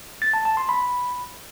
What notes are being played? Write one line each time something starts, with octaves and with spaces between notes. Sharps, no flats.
A6
A5
A5
C6
B5